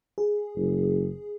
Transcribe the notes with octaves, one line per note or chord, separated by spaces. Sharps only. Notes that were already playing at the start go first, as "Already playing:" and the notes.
G#4
F#1